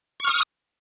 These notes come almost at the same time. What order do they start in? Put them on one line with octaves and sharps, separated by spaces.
C#6 F6 D#6